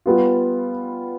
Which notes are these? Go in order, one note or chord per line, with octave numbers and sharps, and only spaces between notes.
G3 B3 F4